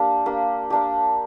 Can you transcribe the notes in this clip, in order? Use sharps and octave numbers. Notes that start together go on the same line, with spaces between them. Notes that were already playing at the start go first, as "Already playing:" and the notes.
Already playing: A#3 D4 G4
A#3 D4 G4
A#3 D4 G4